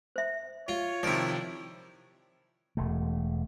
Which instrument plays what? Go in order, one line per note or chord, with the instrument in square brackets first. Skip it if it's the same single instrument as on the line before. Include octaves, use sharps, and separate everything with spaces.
[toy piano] C5 E5
[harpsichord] F4 [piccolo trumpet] C#5
[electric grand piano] C3 D#3 F3 [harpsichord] E4 D5
[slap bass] E1 E2 A3